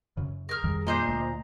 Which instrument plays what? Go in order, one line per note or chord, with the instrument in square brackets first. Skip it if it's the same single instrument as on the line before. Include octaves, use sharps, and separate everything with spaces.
[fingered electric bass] F#2 C#3
[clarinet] G#4 [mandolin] A#4 F6
[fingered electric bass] F2 D#3 G3
[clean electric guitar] A#2 [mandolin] D4 C5 D#5 [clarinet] A#5
[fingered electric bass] D2 A3